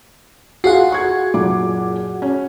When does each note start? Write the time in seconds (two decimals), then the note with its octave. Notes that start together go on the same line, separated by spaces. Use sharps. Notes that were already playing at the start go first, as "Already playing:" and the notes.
0.64 F4 F#4 G#4 F5 F#5 C7
0.92 C#6 G#6
1.34 F#1 A#2 D6
2.22 C#4